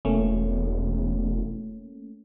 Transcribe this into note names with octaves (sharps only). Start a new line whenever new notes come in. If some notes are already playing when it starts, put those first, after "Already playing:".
E1 A3 A#3 C#4